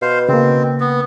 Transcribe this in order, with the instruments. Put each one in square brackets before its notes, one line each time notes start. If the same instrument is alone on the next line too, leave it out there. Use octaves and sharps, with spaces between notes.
[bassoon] B2 [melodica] C5 F5
[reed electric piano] C#3 A#3 [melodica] C4
[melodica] B3